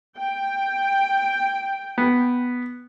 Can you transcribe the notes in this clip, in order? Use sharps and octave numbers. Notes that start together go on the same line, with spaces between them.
G5
B3